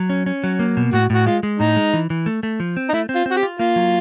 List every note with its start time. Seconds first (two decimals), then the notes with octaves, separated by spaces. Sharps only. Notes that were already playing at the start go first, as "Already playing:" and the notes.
Already playing: F#3
0.10 C#4
0.26 C#4
0.44 F#3
0.59 A#3
0.77 B2
0.93 A2 F#4
1.10 A2 F#4
1.26 G#3 F4
1.43 G#3
1.60 A2 D#4
1.76 G#3
1.94 E3
2.10 E3
2.26 A3
2.43 A3
2.60 F3
2.77 C4
2.89 D#4
2.93 A3 E4
3.09 C4
3.16 F4
3.26 C4
3.31 F#4
3.37 G4
3.43 F4
3.59 A#3 F4
3.76 F#3